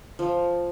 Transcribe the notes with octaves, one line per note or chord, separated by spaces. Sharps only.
F3